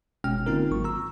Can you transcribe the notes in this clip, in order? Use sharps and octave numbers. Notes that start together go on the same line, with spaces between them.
G1 B2 G#3 C#4 G5 F6
D3 A#3 C4 D#4 F4 A#4
G#1 F#3 C#6
A#5 E6